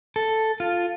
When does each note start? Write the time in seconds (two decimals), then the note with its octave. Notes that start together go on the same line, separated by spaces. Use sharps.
0.16 A4
0.60 F4